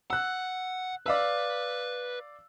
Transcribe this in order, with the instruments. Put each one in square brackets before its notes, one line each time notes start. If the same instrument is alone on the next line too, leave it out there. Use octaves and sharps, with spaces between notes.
[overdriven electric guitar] F#5 [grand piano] E6 F#6
[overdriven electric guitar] B4 [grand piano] D5 F5 E6